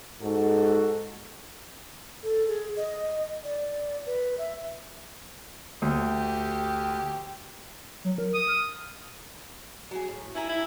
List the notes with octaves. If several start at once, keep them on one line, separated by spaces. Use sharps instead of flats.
G#2 F#4 A4
A4
G#4
D#5
D5
B4
E5
D2 G4
F#3
A#4
D#6
F6
F#3 G#4
A2
G2 E4 G#5 A#5
E4